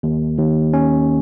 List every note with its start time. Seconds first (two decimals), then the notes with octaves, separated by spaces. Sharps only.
0.03 D#2
0.38 D#2
0.73 C#4